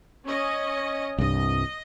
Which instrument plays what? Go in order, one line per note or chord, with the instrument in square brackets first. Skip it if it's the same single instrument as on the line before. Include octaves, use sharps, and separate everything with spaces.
[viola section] C#4 D#5
[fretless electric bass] C2 G2 [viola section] D#5